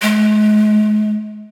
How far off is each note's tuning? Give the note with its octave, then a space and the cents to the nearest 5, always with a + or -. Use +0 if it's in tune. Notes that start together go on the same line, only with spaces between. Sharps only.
G#3 +35